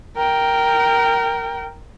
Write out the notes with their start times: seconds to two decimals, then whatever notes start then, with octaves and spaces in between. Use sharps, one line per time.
0.17 A#4 G5